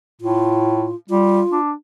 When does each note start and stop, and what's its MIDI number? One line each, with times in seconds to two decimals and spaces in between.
0.21 0.90 45
0.21 0.95 65
1.10 1.42 55
1.10 1.59 65
1.52 1.73 62